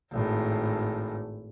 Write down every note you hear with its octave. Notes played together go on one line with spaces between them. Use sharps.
G#1 A2